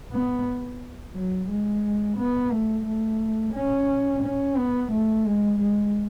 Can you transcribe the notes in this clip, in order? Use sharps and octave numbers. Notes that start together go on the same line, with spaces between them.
B3
F#3
G#3
B3
A3
A3
C#4
C#4
B3
A3
G#3
G#3